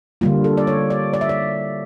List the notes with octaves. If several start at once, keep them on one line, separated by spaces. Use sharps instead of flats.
D3 G3 A#3 F4
A4
D5
C#5
D5
D5
E5
D5